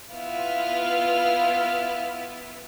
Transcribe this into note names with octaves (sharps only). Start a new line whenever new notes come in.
B3 E4 F4 B4 F6